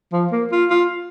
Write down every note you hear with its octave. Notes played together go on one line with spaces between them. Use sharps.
F3
A#3
F4
F4